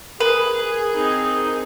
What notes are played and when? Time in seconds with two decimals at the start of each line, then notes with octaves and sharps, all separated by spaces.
0.20 G#4 A#4 B4
0.94 C4 D#4